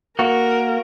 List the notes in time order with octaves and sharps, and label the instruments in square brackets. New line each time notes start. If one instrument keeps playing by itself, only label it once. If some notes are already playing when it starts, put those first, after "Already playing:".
[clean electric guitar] A#3 F#4 [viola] A#4